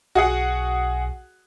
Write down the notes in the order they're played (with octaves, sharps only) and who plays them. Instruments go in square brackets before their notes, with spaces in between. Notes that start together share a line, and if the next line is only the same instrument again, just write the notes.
[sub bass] B1 [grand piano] F#4 G#4 F#5